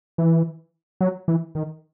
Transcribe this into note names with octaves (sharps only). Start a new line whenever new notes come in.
E3
F#3
E3
D#3